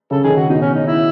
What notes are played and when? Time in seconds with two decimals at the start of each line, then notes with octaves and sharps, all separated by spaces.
0.11 C#3 A4
0.24 D#3 G#4
0.30 C#3
0.37 F#4
0.50 B2 D#4
0.62 C#4
0.75 D#4
0.87 E4